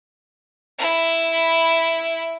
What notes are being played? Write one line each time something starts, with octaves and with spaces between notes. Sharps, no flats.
E4 B5